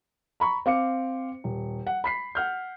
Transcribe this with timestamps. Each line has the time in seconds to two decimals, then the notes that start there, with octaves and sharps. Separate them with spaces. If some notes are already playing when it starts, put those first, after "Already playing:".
0.40 A#5 B5 C#6
0.66 C4 F5 D6 C#7
1.44 D#1
1.87 F#5
2.04 B5 B6 C7
2.35 F#5 F6 G6